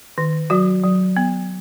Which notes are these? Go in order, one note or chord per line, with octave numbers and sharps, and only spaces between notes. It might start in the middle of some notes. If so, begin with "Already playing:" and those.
D#3
F#3 F#4
F#3
B3